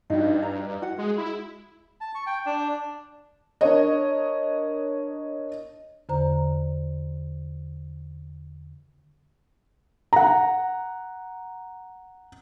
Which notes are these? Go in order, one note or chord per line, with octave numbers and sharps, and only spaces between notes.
G2 D#4 F#4
A#5
F#4 F#5
G#3
E4
A5
C#6
G5
D4
D4 A#4 C#5 D#5
E2 D3 C5 A#5
F#5 A#5